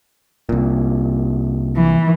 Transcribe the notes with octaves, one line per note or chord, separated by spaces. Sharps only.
C2 A#2
E3